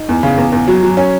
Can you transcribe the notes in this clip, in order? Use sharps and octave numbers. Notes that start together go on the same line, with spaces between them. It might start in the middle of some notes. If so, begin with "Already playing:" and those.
Already playing: D#4
E2
C#3
E2
E2
F#3
F#3
C#4